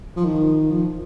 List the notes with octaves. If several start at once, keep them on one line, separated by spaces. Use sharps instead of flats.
F3
D#3
F3